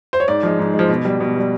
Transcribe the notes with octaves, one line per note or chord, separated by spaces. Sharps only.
C5
C#5
G#2 D5
F3 G#3
G#2
G#3
F3
B2
G3
B2
G3